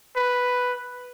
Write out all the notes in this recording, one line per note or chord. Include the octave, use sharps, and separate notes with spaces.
B4